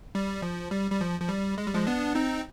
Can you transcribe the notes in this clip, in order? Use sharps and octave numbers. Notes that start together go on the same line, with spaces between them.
G3
F3
G3
G3
F3
F3
G3
G#3
G3
F3 G#3
B3 D4
C4 D#4